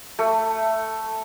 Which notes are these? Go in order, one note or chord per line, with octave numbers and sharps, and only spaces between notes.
A3